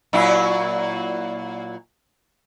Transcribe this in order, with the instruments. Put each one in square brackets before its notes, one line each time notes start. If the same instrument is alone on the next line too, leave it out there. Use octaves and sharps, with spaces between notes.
[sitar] A#2 F#3 E4